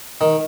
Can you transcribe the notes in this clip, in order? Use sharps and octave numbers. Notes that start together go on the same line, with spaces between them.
D#3